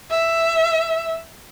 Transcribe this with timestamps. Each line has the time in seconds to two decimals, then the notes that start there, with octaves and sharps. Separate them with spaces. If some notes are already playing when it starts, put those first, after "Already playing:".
0.10 E5